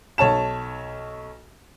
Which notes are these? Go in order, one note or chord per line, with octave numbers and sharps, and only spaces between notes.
B1 C#5 A5 E7